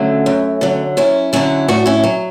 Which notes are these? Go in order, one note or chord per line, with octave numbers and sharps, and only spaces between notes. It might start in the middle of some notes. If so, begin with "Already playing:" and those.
Already playing: D3 F#3 A3 C#4
F#2
D3 F#3
F#2 C#4 E4
D3 F#3 C#4 E4
A2 D4 F#4
C#4 E4
F#3